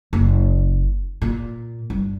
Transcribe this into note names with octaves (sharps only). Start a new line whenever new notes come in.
F#1
A#2
G2